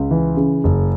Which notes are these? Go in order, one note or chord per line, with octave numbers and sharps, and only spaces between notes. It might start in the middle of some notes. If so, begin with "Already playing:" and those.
Already playing: C#2
E3
C#3
F#1